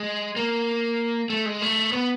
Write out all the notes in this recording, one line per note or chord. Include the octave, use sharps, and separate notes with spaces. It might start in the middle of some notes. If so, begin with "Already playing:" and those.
Already playing: G#3
A#3
A3
G#3
A3
B3